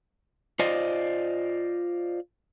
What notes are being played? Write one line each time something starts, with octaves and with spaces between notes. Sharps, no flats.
F4 C5 D5 D#5